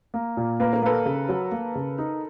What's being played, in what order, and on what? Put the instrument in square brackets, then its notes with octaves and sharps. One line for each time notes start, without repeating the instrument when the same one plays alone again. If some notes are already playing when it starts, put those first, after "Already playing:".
[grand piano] A#3
A#2
[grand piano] A#3 [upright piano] B4
[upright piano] A#4
[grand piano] A#3 [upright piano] A4 B4
[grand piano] C#3
F#3
A#3
C#3
D#4